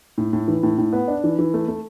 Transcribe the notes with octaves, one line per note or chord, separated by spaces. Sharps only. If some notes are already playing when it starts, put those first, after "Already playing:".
A2
A2
E3
A2
A2
B3
D4
E3
E3
A3
A3